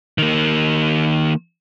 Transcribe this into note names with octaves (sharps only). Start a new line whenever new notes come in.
D#3 A#3